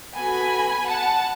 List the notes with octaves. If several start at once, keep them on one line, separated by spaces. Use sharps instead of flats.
B3 F#4 A4 G#5 B5
F#5 A5